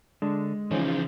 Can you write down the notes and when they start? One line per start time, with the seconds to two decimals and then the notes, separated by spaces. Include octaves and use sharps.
0.22 D3 G#3 D4
0.71 C#3 E3 F3 C#4 D#4 C5